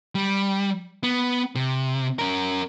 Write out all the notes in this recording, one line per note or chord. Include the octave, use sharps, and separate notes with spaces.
G3
B3
C3
C#4 A#4